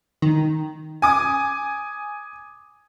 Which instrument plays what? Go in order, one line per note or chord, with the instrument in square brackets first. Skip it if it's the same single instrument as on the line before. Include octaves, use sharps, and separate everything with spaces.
[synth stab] D#3
[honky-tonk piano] G#5 D6 D#6